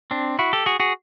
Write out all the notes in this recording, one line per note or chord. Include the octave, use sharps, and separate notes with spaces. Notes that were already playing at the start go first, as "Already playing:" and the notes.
C4 D4
E4 F#4
G4 A4
F#4 G#4
F#4 G#4